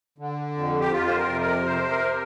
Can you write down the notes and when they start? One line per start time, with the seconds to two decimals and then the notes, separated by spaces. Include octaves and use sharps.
0.18 D3
0.55 F2
0.81 G4
0.92 F2 F4
1.08 C5
1.16 A#4
1.29 C3
1.41 A#4
1.65 C3 C5
1.90 A#4